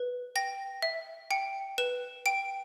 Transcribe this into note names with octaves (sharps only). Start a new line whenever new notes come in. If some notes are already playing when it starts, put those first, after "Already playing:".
Already playing: B4
G5 A#6
E5
G5 C#7
B4 E7
G5 D7